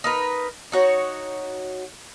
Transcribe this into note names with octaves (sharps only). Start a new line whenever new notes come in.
D#4 A#4 B4
D#4 F#4 C#5